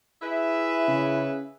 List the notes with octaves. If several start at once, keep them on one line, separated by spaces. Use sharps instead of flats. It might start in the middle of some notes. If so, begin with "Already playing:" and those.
E4 G#4 B4 E5
C#3